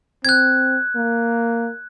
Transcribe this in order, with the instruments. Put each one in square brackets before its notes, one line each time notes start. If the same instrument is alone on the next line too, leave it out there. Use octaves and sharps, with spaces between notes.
[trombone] C4 [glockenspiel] F#6 G#6
[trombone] A#3